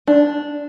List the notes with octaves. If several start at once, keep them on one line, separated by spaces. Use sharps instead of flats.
D4